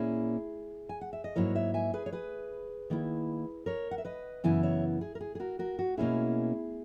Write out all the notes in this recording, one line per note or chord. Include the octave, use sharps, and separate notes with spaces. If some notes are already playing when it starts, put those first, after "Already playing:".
Already playing: A#2 A#3 C#4 E4 G#4
G#5
F#5
E5
D#5
G#2 F#3 A#3 E4 A#4 C#5
C#5 E5
E5 G#5
G#4 B4
C#5
G#4 B4
D#3 A#3 E4
A#4 C#5
F#5
E5
B4 D#5
F#2 C#3 E3 B3 E4 E5 G#5
C#5 E5
G#4
A#4
G#4
G#4
F#4 A#4
F#4 A#4
F#4
B2 A#3 C#4 E4 G#4